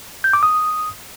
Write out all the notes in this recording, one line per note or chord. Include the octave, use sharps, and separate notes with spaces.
G6
D6
D#6